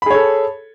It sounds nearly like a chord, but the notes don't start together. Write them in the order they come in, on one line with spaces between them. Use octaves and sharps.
B5 G#4 C#5 A4